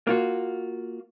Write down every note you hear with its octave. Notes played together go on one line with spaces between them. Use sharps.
A#3 F4 F#4